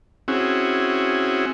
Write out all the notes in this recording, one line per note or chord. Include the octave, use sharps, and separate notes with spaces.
C4 C#4 E4 F#4 G#4